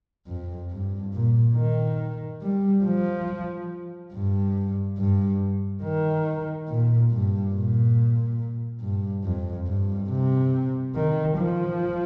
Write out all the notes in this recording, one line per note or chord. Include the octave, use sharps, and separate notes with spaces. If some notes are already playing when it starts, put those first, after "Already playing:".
F2
G2
A#2
D#3
G3
F3
G2
G2
D#3
A#2
G2
A#2
G2
F2
G2
C3
D#3
F3